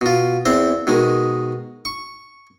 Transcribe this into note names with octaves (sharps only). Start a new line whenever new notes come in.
B2 F4
E2 C4 C5
B2 D#3 G#3
C#6